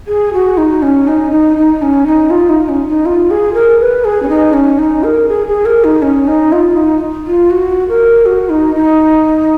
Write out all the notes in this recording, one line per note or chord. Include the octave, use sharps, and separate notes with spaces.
G#4
F#4
D#4
C#4
D#4
D#4
D#4
C#4
D#4
F4
D#4
C#4
D#4
F4
G#4
A#4
B4
G#4
C#4
D#4
C#4
D#4
A#4
G#4
G#4
A#4
D#4
C#4
D#4
F4
D#4
F4
F#4
A#4
F#4
D#4
D#4